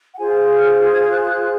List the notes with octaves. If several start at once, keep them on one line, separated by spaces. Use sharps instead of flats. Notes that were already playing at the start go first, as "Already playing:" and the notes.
F#5
F4 G#4 C5 G#5
F6
G#6
F#6
G#6
F#6